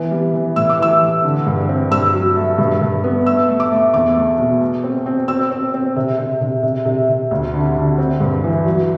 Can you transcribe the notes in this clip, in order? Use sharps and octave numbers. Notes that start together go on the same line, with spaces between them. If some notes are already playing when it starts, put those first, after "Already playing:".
Already playing: E3 B3
G3
E3
A2 E6
D6
E3 E6
A2
D3
G2
C4
G2 E6
F#3
A3
G2
G2
B3
A3 E6
A3
D6
A3
E2 D6
A3
B2
A3
C4
C4
C4 E6
C4
C4
C3
C3
C3
C3
C3
C3
D2
D3
D3
C4
G2
E3
F#3